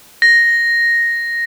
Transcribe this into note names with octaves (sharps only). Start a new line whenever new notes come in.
A#6